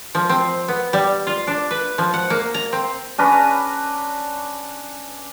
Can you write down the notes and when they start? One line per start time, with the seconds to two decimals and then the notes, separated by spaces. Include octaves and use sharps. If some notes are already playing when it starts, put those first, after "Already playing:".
0.15 F3
0.29 C4
0.68 B3
0.93 G3
1.27 F4
1.47 D4
1.71 B4
1.98 F3
2.14 F#5
2.30 A#3
2.54 A#5
2.73 C4
3.18 C#4 D4 B4 D5 A#5